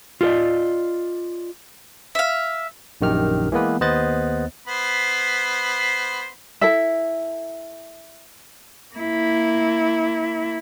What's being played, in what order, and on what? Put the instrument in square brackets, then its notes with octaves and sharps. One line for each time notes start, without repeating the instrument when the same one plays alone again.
[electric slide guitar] F4 F#4 A4 D5 D#5
[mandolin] E5 F5
[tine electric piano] A#1 F#2 D#3 G4 F6
E3 G#3 A#3 B3 B4
D#2 B3 C5 D#5 F#6 A6
[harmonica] B3 C5 B5
[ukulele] E4 A4 E5
[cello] A#3 E4